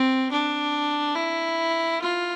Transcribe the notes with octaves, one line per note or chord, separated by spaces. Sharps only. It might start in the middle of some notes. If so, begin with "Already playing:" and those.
Already playing: C4
D4
E4
F4